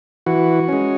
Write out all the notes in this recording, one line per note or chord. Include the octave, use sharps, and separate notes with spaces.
E3 F#4
G#3 C#4